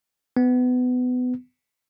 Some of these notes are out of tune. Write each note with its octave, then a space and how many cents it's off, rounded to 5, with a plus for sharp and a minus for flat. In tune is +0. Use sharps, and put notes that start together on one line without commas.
B3 +20